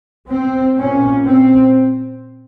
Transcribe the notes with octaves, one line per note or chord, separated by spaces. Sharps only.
C4
A#2 C#4
C4